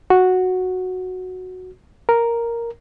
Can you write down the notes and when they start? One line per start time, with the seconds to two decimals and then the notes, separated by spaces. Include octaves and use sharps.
0.10 F#4
2.09 A#4